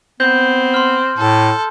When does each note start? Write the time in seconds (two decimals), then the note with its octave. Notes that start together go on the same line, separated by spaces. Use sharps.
0.20 B3 C4 G6
0.74 C6 F6
1.18 A2 A4